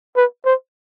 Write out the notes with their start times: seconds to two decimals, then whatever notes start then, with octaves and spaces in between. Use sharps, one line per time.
0.16 B4
0.45 C5